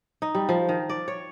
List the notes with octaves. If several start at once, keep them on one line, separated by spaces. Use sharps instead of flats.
D#4
G3
F3
D#3
D5
C#5